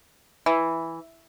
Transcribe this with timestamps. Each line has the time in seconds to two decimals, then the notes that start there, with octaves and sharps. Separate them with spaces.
0.46 E3